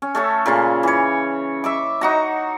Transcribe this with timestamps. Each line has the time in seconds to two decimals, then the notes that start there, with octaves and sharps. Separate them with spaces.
0.02 C#4
0.15 A3 C#4 A4
0.46 A#2 C#3 F4
0.83 E3 C#5
1.64 E5 C#6 D6
2.01 D#4 F#4 A#5